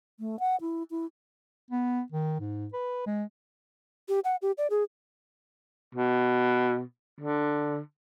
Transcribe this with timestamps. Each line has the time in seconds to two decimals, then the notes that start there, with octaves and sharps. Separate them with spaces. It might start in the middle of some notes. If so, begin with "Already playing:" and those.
0.20 A3
0.39 F#5
0.61 E4
0.91 E4
1.71 B3
2.12 D#3
2.40 G#2
2.73 B4
3.06 G#3
4.09 G4
4.24 F#5
4.42 G4
4.58 D5
4.70 G#4
5.95 B2
7.21 D3